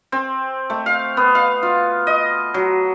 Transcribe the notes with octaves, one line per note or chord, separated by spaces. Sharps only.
C4
A3
F5
B3
F5
F4
D#5
F#3